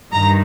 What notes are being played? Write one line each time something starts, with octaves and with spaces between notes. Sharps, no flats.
G2 D#3 A#5